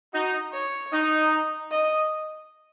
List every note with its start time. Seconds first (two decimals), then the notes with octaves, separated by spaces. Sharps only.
0.13 D#4 F#4
0.53 C#5
0.93 D#4
1.71 D#5